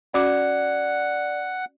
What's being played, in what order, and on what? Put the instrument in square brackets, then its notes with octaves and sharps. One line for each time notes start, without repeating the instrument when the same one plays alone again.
[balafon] C#4 F#4 D6 [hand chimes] D5 [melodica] F#5